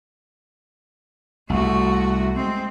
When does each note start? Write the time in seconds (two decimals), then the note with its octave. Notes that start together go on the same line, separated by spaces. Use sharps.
1.50 C2 A3 F#4
2.36 G#3 C4